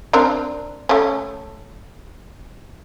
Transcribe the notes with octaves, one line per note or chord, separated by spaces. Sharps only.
C4 D4 A#4
A3 C#4